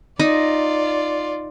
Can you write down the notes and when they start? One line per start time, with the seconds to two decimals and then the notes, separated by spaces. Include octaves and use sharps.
0.20 D#4 F4 D5